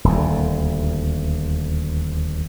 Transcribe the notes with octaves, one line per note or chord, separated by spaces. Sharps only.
D#1 D2